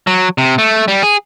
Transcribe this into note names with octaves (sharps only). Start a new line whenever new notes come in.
F#3
C3
A3
G3
G#4